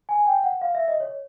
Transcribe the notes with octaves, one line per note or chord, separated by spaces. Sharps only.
G#5
G5
F#5
F5
E5
D#5
C#5